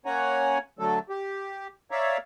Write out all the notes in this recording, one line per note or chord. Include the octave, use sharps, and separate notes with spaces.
A#3 C#4 C#5 F#5 G#5 A#5
D3 F#3 A3 A4
G4
C#5 D5 E5 F5 A#5